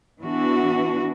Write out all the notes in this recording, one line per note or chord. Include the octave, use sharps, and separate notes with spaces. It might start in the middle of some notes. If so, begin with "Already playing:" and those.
E3 B3 D4 F#4